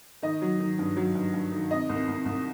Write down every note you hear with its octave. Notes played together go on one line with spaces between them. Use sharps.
D#3 D#5
F#3
D#3
G2
F#3
G2
G2
D#3
C3 D#5
C2
C2
C2